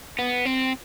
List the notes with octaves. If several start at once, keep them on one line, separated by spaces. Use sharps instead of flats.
B3
C4